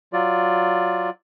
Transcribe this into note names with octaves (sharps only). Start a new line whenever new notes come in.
F#3 F4 D5